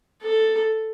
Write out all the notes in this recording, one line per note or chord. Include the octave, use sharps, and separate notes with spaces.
A4